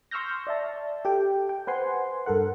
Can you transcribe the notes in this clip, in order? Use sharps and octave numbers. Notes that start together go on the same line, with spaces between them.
C6 C#6 E6 F6 G6 A#6
D5 E5 A5
G4 A4 G5
G5
B4 C5 F#5 G#5 C6
G2 A4 A#4 F#5